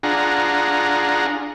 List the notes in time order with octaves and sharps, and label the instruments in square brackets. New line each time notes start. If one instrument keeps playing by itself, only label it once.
[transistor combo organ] D4 F4 G#4 F#5 A#5